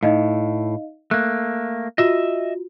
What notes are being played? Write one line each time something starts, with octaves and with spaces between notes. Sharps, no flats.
A2 D#4 D#5 F5
A3 A#3 F#6
F4 F#4 D#5 E5